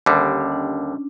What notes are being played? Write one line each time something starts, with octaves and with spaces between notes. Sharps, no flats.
D#2 D3 G3 C#4
C#4
D4